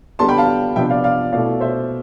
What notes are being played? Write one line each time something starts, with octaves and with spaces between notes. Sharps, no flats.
D3 G3 B3 A5 C6
G5 B5
F5 A5
C3 F3 B3 D4 E5 G5
D5 F5
D5 F5
B2 A3 E4 D5 F5
C5 E5